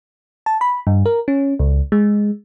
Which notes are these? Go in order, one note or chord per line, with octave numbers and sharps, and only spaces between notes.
A5
B5
G2
A#4
C#4
C#2
G#3